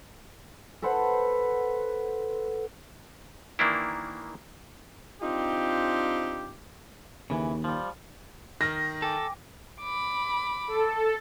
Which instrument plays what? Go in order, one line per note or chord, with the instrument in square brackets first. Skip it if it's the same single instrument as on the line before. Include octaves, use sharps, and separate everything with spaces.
[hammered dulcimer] A4 B4 C5 F#5
[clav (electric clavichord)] D#3 E3 A#3 D4 E4
[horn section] C4 D4 D#4 F4 G4
[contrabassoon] D#2 [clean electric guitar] C#3 E3
[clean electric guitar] F3 G3
[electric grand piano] D#3 F6 [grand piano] A#6
[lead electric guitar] A4 [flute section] G5 G#5 D6
[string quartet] B5 D6
[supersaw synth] A4